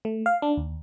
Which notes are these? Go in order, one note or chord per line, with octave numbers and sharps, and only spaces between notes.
A3
F5
D4
D#2